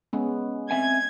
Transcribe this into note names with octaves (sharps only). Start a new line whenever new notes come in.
G#3 B3 C#4
C4 E5 G#5 G#6